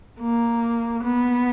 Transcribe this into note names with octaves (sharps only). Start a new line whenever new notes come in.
A#3
B3